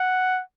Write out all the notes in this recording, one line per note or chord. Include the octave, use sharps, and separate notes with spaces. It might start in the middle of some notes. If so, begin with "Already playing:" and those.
Already playing: F#5